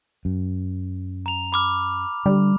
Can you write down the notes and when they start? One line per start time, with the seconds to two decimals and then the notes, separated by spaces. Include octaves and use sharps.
0.25 F#2
1.26 A#5 F7
1.52 B5 D6 F6
2.26 D3 G3